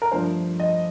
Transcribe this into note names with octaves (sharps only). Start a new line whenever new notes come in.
A#4
G2 F3 A3 D4 C5
D#5